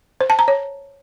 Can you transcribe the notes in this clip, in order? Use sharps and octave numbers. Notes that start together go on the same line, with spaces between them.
C5
A5
A#5
C#5